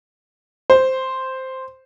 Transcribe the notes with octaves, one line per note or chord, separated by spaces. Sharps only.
C5